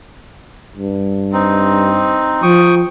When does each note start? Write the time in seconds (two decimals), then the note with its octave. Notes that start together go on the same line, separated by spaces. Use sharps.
0.77 G2
1.33 C4 D#4
2.42 F3 G5 C#6 D#6